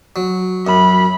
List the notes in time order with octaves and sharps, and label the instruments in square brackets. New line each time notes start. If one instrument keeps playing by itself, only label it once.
[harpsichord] F#3
[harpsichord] F#2 [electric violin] B5